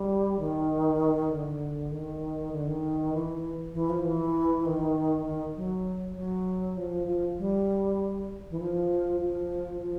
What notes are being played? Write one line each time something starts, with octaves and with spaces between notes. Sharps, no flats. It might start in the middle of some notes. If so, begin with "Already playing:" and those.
Already playing: G3
D#3
D3
D#3
D3
D#3
E3
E3
F3
E3
D#3
D#3
F#3
F#3
F3
F3
G3
E3
F3
F3
F3